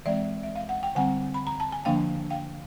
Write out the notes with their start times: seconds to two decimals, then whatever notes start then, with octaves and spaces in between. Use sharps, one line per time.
0.06 E3 G#3 C4 D5 E5
0.43 E5
0.56 F5
0.69 F#5
0.83 G5
0.95 D3 G3 C4 F#5 G#5
1.34 B5
1.47 A#5
1.60 A5
1.72 G#5
1.85 D3 F3 A#3 D4 F5 G5
2.30 F5 G5